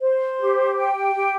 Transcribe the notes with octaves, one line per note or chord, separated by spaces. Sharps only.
C5
G4
G5
G4